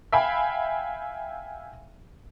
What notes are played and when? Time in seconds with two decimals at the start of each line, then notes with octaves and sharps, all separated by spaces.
0.12 E5 F5 G5 G#5 B5